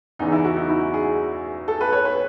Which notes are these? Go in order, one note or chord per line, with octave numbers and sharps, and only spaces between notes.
E2 C#3 E3 D#4
E4
F#4
D#4
E4
G#4
A4
B4
C#5
B4